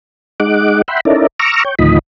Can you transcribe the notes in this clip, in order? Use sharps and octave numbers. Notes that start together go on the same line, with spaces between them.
G#3 D#4 F#5 D6
E5 F#5 G5 B5 C6
C#4 D#4 E4 A4 A#4 D5
A#5 C#6 D6 E6 F6
C#5 G5
D2 A2 D#3 F3 D#5 B5